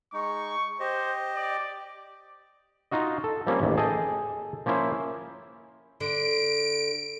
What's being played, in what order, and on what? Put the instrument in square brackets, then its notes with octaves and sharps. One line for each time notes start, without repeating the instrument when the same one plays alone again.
[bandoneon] G#3 D#4 [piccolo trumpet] C#6
[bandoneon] G4 D#5 [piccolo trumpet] C5
[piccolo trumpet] D5
[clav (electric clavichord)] D#4 F4 F#4 D#5
A4
F3 G3 A#3 C4 C#4
A1 D#2
G#4 A4 D#5 G5 A5
F3 A#3 C#4 E4 C5
[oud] D3 [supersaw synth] D7